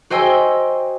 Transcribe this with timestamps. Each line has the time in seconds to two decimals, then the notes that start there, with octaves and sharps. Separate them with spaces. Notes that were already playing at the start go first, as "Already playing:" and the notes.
0.10 F#4 C5 D#5 G5 G#5 E6